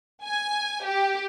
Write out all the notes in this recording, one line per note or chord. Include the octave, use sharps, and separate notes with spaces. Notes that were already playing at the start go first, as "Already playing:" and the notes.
G#5
G4